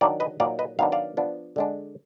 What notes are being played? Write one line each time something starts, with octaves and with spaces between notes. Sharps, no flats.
D#3 F#3 D4 D5 F5
B4 D#5
A#2 F#3 A#3 D#4 D5 F5
B4 D#5
D#3 F#3 B3 D4 F5
D5 F5
F3 B3 D4
D3 G#3 D4